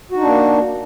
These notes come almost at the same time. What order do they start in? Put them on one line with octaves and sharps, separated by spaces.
F#4 D#4 D4 A#3